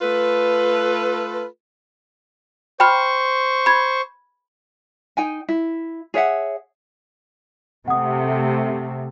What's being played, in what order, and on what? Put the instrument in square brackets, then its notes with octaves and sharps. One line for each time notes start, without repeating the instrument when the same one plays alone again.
[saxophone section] A3 F4 A4 B4
[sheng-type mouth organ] C5 C#6 [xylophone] G5 B5 F6
[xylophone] B5 G#6
[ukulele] D#4 G5 G#5
E4
G#4 C#5 E5 F#5
[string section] C3 A3 [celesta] F#5 D#6